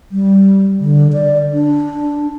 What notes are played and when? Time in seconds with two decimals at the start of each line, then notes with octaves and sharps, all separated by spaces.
0.11 G3
0.80 D3
1.13 D5
1.52 D4